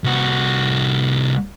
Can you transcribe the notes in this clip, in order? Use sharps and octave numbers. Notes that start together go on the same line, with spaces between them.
C2 F#4